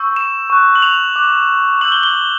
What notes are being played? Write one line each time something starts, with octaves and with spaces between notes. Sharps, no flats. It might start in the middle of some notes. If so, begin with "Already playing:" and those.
Already playing: C#6 E6 G6
E7
C#6 F#6
F#7
F7
D6 F#6
C#6 E6 G6 F#7
G7
G7